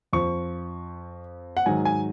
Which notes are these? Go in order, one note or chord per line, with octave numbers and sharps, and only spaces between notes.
F2 F3 C#6
F#5
G#2 D#3 F#3 G#5
G#5